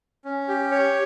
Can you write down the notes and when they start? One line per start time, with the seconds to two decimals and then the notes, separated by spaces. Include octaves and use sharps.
0.25 C#4
0.48 G4
0.71 C#5